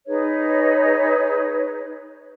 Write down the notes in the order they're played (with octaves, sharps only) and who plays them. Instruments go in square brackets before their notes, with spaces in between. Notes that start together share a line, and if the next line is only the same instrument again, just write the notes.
[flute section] D#4 G#4 B4 C#5